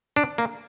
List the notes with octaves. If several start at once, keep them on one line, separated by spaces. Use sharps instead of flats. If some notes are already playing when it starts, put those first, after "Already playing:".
D4
A#3